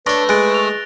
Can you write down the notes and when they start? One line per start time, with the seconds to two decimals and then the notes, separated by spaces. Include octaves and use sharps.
0.07 A3 D4 B4 C#5 A#6 G7
0.29 G#3 F#6 A6 D7
0.54 F7